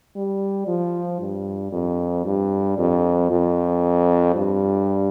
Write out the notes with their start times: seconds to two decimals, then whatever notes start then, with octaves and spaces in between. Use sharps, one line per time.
0.16 G3
0.67 F3
1.20 G2
1.72 F2
2.25 G2
2.78 F2
3.30 F2
4.35 G2